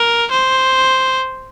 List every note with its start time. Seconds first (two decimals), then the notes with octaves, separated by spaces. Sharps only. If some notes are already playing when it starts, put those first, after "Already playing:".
Already playing: A#4
0.31 C5